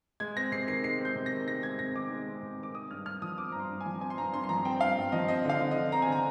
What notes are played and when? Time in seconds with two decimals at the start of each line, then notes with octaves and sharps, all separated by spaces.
0.20 G#3 G#6
0.36 C4 A#6
0.52 C3 C7
0.67 D#3 C7
0.84 G#3 C7
1.00 C4
1.05 G6
1.16 C3
1.26 A#6
1.32 D#3
1.47 G#3 A#6
1.63 C4 G#6
1.79 C3 A#6
1.95 D#3 D6
2.11 G#3
2.27 C4
2.43 C3
2.59 D#3 D6
2.74 C4 D#6
2.91 G2 F6
3.06 G2 F6
3.22 F3 D#6
3.38 C4 D6
3.52 G2 A#5
3.60 C6
3.70 G2
3.81 G#5
3.86 F3
4.01 C4 G#5
4.10 C6
4.18 G2 A#5
4.33 G2 C6
4.44 C6
4.49 F3 A#5
4.65 C4 G5
4.81 G2 F5
4.97 G2 G5
5.12 F3 D#5
5.28 C4 D#5
5.45 D3 F5
5.61 D3
5.71 D#5
5.77 F3
5.92 C4 A#5
6.02 G#5
6.07 D3 A#5